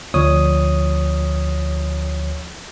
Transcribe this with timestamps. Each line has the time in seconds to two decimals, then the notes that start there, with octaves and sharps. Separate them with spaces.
0.14 D2 F3 C#5 D#6